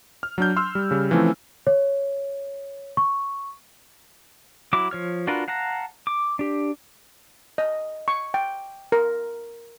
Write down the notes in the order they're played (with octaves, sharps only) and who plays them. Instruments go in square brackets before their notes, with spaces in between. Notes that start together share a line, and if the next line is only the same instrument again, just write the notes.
[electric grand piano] F6
F#3 D4 G6
C6 E6 F6
G3
C#3 G3
E3 F3 A3 C4 C#4 E4
[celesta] C#5
C#6
[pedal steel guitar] F#3 E4 D6
F3 C#5 F6
D4 F4 F#4 A#4 B4
F5 F#5 A5 A#5
D6
D4 G4
[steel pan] D#5
C#6
G5
A#4